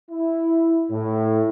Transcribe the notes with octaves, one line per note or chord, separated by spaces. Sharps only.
E4
A2